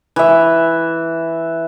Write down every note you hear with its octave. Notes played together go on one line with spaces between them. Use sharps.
E3 E5